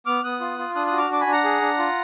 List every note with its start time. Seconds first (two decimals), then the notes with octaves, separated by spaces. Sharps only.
0.06 B3 D6 F6
0.24 B3 D#6 F#6
0.40 F4
0.58 F4
0.75 D4 D#6 F#6
0.87 F#4 D#6 F#6
0.98 D6 F6
1.10 D4 D6
1.21 G#5 B5
1.27 D4
1.32 F#5 A#5
1.44 G#4
1.62 D4
1.78 F4